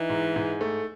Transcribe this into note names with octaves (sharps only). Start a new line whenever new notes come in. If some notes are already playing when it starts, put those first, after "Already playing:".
Already playing: E3 D#4
G#2
G#2
A3